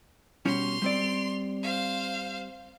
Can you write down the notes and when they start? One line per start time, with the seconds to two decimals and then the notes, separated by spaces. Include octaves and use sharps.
0.46 B2 G3 C#4 C6 F7
0.82 G3 C4 D5
1.63 C5 F5